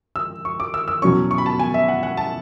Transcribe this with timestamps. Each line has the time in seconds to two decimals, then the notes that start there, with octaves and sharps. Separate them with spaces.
0.16 E6
0.45 C#6
0.60 D6
0.74 E6
0.88 E6
1.02 E2 B2 F#3 C#4 C#6
1.31 C#6
1.38 B5
1.46 A5
1.60 G#5
1.74 E5
1.88 F#5
2.03 F#5
2.17 A5